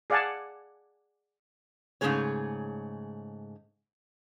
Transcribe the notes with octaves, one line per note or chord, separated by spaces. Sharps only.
G#4 D5 F5 F#5 G#5 A5
G#2 C#3 E3 A3 G#4 C#5